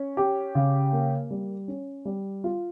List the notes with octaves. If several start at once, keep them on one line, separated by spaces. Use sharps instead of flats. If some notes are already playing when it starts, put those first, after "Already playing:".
Already playing: C#4
G4
C#3
A#3
G3
C#4
G3
F4